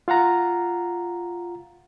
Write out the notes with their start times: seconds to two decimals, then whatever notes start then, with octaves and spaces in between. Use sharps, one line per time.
0.08 F4 F5 F#5 A#5